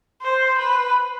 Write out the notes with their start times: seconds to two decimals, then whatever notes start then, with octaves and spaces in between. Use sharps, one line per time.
0.22 C5
0.59 B4